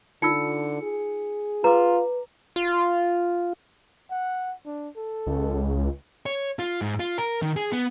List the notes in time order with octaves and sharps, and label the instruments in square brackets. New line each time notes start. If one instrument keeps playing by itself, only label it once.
[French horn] D3 [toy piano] D#4 F4 E6 [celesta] C#7
[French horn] G#4
[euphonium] F4 [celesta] B4 [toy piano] A#5 D6
[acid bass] F4
[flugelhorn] F#5
D4
A4
[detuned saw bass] C#2
[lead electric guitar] C#5
F4
G#2
F4
A#4
D#3
G#4
B3